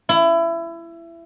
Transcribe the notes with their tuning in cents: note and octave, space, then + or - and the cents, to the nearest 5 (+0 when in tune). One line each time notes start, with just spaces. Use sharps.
E4 +25